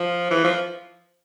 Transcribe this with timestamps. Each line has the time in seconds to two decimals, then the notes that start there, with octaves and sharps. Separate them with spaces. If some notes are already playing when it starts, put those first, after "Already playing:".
Already playing: F3
0.31 E3
0.44 F3